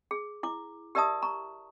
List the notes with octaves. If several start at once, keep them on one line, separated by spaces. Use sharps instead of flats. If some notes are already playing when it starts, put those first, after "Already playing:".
G#4
E4 D6
G4 A#4 D5 E5 A5 D#6
A#5 C#6